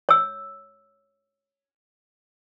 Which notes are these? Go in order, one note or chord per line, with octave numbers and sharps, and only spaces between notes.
C#5 E6